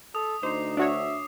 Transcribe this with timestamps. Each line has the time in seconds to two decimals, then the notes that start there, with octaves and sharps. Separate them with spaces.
0.15 A4 D#6
0.43 D2 D#4 C5 D6 C7
0.77 D4 F#4 C#5 E5